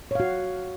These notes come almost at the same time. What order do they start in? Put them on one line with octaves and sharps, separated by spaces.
C#5 F5 F#4